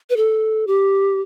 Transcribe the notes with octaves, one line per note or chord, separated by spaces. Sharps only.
B4
A4
G4